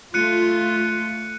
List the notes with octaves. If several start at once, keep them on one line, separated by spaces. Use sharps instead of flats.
A3 F4 F#6 C#7 D#7